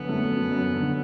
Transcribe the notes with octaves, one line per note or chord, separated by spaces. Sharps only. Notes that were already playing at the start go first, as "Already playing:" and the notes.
Already playing: F#2 D3 B3
A3
F#2
F#2
D3